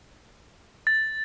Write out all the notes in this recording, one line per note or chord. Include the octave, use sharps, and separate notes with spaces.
A6